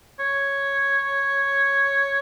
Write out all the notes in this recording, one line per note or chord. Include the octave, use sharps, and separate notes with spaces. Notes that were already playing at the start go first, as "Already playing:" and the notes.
C#5